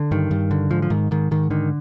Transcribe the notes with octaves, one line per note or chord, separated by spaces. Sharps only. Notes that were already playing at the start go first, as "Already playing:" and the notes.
Already playing: D3
G2 D#3
G2
D3
G#2 F3
F3
G#2 D#3
G#2 D#3
G#2 D#3
D3 D#3